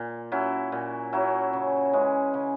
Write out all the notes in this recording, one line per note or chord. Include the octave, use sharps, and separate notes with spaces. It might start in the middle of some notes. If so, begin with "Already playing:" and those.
Already playing: A#2
F#3 C#4 E4
A#2
F#3 C#4 E4
C#3
E3 G#3 C#4
C#3